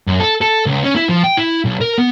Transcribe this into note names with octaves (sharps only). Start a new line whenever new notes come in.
F#2
A4
A4
C#2
C#4
E4
F3
G5
E4
B1
A#4
B3